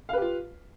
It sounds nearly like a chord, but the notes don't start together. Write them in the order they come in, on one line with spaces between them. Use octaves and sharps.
F5 B4 G4 F4